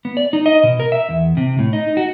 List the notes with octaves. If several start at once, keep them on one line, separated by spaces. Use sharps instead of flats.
B3
D5
D#4
D#5
B2
A#4
E5
E2
C3
A2
D#4
F#4